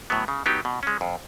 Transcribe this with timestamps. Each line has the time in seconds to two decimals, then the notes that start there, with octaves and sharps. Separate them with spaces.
0.10 A2 F#3 B3
0.28 C#3
0.46 F#3 B3 D#4 G4
0.65 B2
0.83 G#3 C#4
1.01 F2